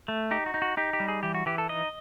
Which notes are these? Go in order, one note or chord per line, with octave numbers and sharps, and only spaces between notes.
A3
D#4 G4
F#4
D#4
F#4
D#4 G4
G4
G3
G#4
E3 G4
F#4
E3 G4
A4
D#4 D#5